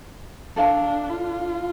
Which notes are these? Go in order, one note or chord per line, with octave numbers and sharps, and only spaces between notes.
D4 A4 D5 F5 A5
F4